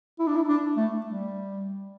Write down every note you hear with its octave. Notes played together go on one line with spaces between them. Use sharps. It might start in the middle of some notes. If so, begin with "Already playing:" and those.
E4
D4
E4
D4
A3
G3